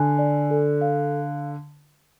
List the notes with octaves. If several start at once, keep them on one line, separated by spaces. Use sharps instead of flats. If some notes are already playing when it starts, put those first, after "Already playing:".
Already playing: D3 G#5
D5
A4
F5